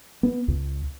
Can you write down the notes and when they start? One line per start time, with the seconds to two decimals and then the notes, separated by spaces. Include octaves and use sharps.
0.23 B3
0.48 C#2